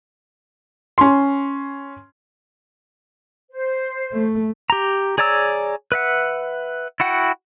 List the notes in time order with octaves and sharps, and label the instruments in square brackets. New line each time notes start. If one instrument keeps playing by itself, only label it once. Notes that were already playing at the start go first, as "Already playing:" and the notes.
[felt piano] C#4 C6
[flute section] C5
[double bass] A3
[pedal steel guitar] G4 A#5
G#4 C#5 D5 A#5 E6
B4 E5 F#5
E4 F#4 F#5 G5